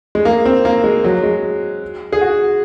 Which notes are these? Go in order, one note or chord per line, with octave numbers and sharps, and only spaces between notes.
G#3
A#3
C4
A#3
G#3
F#3
G#3
G#4
F#4